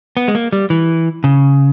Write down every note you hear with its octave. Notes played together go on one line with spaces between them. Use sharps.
B3
G#3
A#3
G3
E3
C#3